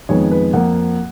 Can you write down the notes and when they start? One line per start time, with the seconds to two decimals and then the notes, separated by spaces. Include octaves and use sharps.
0.09 F2 D#3 G#3 B3 C#5
0.32 B4
0.53 F2 F3 A#3 F#5